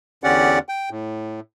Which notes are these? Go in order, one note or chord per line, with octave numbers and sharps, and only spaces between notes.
E2 D3 C#4 G4 D5 F#5
G5
A2